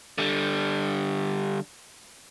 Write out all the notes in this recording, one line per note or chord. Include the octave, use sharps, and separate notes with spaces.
D3 G3